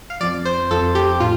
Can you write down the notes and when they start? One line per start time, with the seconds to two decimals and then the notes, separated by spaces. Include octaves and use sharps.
0.10 F5
0.21 F2 F3 D5
0.45 C5
0.71 F2 F3 A4
0.95 G4
1.20 A2 F4